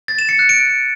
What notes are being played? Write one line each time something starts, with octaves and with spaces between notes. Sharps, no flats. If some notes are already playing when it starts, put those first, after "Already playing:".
A6
E7
C#7
F#6
D7